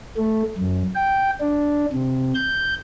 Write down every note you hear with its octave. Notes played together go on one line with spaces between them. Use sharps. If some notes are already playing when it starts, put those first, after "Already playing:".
A3
F#2
G5
D4
C3
G6